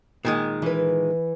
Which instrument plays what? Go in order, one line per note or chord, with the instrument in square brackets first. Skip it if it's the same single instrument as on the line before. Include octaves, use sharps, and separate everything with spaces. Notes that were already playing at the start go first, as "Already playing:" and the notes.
[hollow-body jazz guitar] A#2 D#3 G#3
[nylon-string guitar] E3 B4